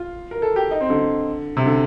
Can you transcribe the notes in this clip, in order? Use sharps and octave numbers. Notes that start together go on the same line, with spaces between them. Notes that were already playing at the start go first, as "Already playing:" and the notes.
Already playing: F4
A#4
A4
G4
D#4
C4
D3
C3
D3